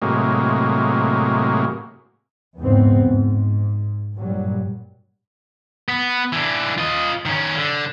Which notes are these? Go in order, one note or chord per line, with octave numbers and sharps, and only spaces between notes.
A2 C3 F#3 G#3 A#3
A#1 E2 G#2 C#3 B3 C4
G#2
G2 A#2 F#3 G3
B3
E3 D4
F4 D#5
D#3 C#4
D3